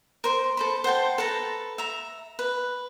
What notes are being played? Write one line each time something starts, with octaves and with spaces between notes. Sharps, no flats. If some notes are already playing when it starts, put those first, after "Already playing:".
A#4 C5
A4 C5 B5
C5 F#5 G5 A5
A4 B4 A5 A#5
E5 A#5
B4